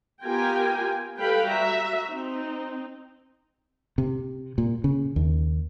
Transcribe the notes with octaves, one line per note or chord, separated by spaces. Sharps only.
B3 F4 G4 A#4 G5 G#5
G3 A4 B4 F5 G5 B5
F#4 E5 A#5
C4 D#4
C3
A#2
C#3
D#2